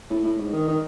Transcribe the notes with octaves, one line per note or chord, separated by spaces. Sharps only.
A2
A2
G#2
D#3
D#3